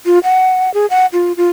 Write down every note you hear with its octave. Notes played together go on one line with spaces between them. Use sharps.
F4
F#5
G#4
F#5
F4
F4